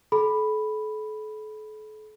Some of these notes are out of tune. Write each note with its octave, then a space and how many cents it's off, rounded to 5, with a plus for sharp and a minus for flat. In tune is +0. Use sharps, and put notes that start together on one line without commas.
A4 -40 B5 +0